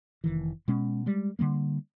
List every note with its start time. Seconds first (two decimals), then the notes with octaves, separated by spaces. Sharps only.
0.24 F1 D#3 E3
0.68 B2 G#3 C#4
1.06 G3 G#3
1.39 D3 F#3 G3 A#3